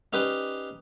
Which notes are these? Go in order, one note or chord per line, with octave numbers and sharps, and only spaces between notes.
C#4 D#4 G4 B4 C5 D5